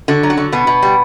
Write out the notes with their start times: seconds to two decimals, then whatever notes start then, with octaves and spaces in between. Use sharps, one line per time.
0.08 D3 F#4
0.23 F#3
0.30 F#4
0.37 D3
0.52 B2 B3
0.67 B2
0.82 G3